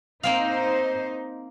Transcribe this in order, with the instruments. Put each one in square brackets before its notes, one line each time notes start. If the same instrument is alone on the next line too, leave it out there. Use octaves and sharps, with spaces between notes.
[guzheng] A#3 C4 F5 [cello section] D#4 C5